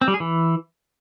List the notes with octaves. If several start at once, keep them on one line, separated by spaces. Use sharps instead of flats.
C4
G3
G#4
E3